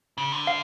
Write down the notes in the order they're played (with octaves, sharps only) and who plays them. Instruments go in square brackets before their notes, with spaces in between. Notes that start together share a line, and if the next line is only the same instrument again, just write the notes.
[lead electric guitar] C#3
D3
[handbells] F5